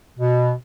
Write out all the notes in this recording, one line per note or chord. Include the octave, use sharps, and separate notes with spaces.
B2